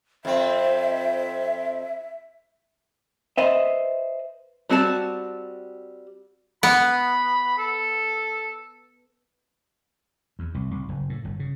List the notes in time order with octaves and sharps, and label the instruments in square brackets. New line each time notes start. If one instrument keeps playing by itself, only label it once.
[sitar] F2 C4 [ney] E5
[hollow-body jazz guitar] B4 C5 D#5 E5
[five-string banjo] G3 C4 F#4 A4 A5
[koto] B3 [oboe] B5
[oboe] A4
[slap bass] E2
C2
C2
F#1
A2
G1
C#3